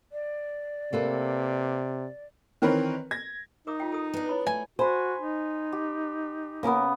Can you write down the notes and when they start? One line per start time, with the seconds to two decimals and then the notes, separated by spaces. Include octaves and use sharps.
0.12 D5
0.93 C3 A#3 A4 B4
2.62 D#3 E3 C4 A#4 B4 C#5
3.11 G#6 A#6
3.67 D#4 A#4 D6 D#6
3.80 F4 G5
3.92 A4 D#6
4.14 B3 D4
4.29 E4 C#5 B5
4.47 A3 G#5
4.79 F#4 C5 G#5 B5 C6
5.20 D#4
5.72 G4
6.63 C#3 A#3 B3 C#4 A#4